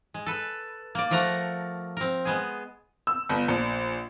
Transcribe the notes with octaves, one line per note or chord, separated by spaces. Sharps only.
G#3
A4 B4
A#3 D5
F3 A3 A#4 F#5 A#5
C4 A#4
G#3 B3 G#4
E6
G1
A#1